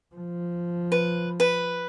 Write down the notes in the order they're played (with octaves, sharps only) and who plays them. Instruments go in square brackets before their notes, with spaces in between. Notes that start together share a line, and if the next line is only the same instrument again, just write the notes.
[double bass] F3
[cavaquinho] B4
B4